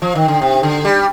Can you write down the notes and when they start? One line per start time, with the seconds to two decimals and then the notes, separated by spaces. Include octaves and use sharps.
0.02 F3
0.15 D#3
0.28 D3
0.42 C3
0.63 D3
0.85 G3